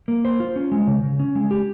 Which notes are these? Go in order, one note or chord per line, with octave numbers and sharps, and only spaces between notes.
A#3
C5
F4
C#4
G#3
C#3
C#3
C#4
G#3
G4